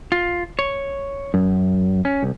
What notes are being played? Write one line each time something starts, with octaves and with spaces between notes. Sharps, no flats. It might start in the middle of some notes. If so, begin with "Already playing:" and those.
F4
C#5
F#2
C#4
C2